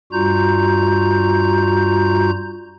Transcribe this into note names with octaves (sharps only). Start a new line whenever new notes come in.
G2 G3 F4 F#4 A#5 G6